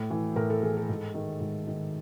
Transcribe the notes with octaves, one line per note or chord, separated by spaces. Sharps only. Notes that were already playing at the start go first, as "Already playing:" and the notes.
Already playing: A2
E3
A2 A#4
A4
E3 G#4
A4
G#2
D#3
G#2
D#3